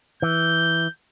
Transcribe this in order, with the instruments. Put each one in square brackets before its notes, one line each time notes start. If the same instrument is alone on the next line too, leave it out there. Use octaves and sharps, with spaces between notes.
[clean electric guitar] E3 [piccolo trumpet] G6